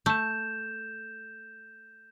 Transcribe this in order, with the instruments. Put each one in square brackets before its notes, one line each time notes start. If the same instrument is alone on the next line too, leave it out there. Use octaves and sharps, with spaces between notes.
[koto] A3 [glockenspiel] G6 E7